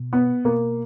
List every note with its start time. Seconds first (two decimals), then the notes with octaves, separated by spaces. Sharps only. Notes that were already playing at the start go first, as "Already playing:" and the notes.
Already playing: B2
0.13 B3
0.45 B2 A#3